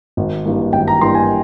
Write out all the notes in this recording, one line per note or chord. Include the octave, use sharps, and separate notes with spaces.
G#1
G2 E3 A#3
G#1 G5
A#5
G2 E3 A#3 C6
G#5